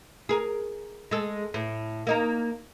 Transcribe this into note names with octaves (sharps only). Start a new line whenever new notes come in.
G#4 A#4
G#3 A4
A2
A#3 D#4 A#4